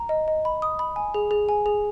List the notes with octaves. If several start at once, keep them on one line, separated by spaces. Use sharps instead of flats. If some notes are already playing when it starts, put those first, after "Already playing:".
Already playing: A#5
D#5
D#5
B5
D#6
B5
G#5
G#4
G#4
G#5
G#4